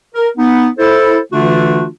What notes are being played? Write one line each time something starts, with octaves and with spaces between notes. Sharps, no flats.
A#4
B3 D#4
E4 A4 C5
D3 E3 A3 D4 F4 F#4